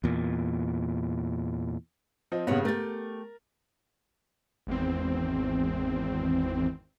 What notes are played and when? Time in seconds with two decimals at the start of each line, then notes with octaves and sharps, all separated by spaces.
0.04 E2 A#2
2.32 F3 C4 D#5
2.47 G2 A#2 C#3 B3 C#5 F#5
2.65 A3 G4 A#4 A6
4.67 G#1 E2 C4